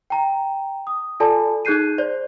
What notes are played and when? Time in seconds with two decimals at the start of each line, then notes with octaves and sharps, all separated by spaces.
0.10 G5 A#5
0.87 D#6
1.20 F4 A4 D5 G#5 A5 B5
1.65 D#4 G#4 F#6 G6 C7 D#7
1.98 C5 D5